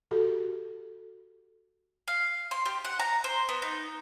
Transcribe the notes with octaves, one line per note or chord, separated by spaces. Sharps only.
F#4 G4 A4
F5
C6
G4
F#5
A#5
C5
B3
D#4